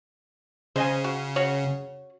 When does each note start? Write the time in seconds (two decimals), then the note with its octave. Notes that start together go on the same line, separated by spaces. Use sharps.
0.76 C#3 C5 D#5 G#5
1.04 F#4
1.36 C#4 F#4 C#5